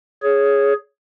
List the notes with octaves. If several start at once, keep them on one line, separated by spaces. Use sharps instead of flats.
G#4 C#5